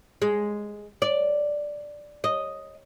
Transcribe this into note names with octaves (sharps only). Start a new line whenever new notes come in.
G#3
D5
D#5